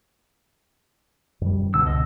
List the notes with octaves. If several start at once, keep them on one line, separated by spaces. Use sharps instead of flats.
F#2 D#3 G3
C#2 B2 D3 E6
D#5